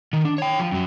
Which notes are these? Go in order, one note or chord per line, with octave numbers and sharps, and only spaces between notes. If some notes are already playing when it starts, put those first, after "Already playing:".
D#3
D4
C#5 G5
F3
F#2 F#3